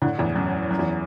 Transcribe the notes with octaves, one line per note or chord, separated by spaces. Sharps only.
A2 D3
E2 A2
F#2
F#2
E2